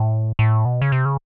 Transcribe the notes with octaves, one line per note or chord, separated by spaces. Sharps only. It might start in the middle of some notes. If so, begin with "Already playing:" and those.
Already playing: A2
A2
B2
C#3
C3
C#3